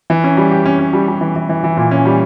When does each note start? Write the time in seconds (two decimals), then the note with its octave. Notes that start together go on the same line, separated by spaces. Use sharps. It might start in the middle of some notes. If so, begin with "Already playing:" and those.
0.10 E3
0.24 C#4
0.37 G3
0.51 G4
0.66 C#4
0.79 C#4
0.93 G3
1.08 G3
1.21 E3
1.36 E3
1.49 E3
1.64 E3
1.77 A#2
1.91 C#4
2.05 G3